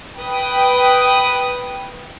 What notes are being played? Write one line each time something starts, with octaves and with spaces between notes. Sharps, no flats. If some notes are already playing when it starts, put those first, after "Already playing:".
B4 G5 D#6